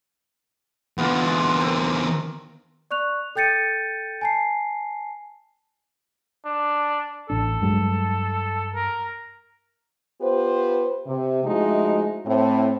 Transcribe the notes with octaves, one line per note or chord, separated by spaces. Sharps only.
E2 D3 B3 F4 G#5
G#3
C4 A#4
D5 C#6 F#6 F7
A4 G5 G6 A6 C#7 D#7
G#5 A5 C7
D4
A1 D4 A4
G2 F#3 G#3
A#4
B3 F4 G4 B4 C5
C3
F3 G#3 A3 D#4 E4 F#4
A2 C4